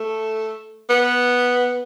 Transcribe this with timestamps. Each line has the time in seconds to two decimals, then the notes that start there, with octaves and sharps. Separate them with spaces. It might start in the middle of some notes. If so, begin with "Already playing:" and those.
Already playing: A3
0.90 B3